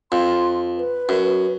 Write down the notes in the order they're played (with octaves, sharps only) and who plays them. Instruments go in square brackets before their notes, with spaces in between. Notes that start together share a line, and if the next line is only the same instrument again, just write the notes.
[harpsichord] F2 [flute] C6
[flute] B4
[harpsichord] F#2